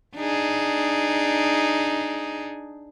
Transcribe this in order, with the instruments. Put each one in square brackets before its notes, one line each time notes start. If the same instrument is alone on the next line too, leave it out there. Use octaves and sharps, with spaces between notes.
[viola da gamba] D4 D#4 G#4